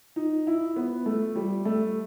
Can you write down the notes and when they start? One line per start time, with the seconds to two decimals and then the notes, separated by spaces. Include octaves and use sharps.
0.16 D#4
0.47 E4
0.76 B3
1.06 A3
1.36 G3
1.65 A3